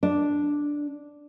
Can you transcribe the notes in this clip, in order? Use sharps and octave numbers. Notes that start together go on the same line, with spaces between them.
D4